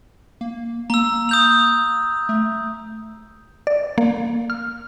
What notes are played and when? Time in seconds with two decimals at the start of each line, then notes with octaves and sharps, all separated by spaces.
0.41 A#3
0.90 A#3 A#5 E6
1.29 D#6 G6 F7
2.29 A3
3.67 D5
3.98 A#3
4.50 F6